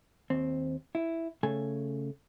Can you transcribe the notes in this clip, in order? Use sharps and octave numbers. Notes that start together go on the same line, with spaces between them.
D#2 C4
E4
C#3 A3 A4 G#5